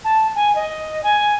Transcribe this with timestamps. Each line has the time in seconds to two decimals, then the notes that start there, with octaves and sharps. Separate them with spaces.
0.04 A5
0.35 G#5
0.55 D#5
1.04 G#5